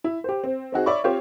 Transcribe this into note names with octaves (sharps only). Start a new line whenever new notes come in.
E4
G4 C5
C4
C4 D#4 F#4 G#4
C#5 D5 E5 B5 C#6
C4 F4 G4 C5 C#5